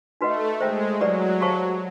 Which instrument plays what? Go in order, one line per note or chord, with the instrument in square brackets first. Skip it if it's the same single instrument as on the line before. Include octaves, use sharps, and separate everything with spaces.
[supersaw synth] A3 [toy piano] D#4 F#4 B4 D#5 F#5
[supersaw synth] G#3 [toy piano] C5 E5 G5 A#5
[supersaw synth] F#3 [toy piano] E4 G4 B4 D5 F#5
[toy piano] G4 C5 F5 A5 C#6